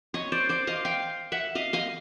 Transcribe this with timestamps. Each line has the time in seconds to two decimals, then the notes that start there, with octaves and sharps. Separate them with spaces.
0.14 C#5 D#5
0.32 C5 D5
0.49 C5 D5
0.67 D#5 F5
0.85 F5 G5
1.32 E5 F#5
1.55 D#5 F5
1.73 D#5 F5